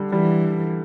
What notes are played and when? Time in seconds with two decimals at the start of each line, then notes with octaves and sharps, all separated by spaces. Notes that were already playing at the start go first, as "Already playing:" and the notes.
Already playing: D3 G3
0.12 E3 G3